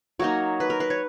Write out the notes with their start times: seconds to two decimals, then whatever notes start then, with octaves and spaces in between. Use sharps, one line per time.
0.19 F#3 A#3 D#4 C#5
0.60 B4
0.70 A#4
0.80 B4
0.90 C#5